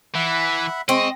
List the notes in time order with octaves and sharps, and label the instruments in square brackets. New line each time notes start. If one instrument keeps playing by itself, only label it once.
[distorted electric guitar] E3 [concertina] E5 F#5 B5
[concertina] G#3 C#6 [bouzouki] C4 [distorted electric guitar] D#5